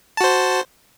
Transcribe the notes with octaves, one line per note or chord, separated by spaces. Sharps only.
F#4 C5 A5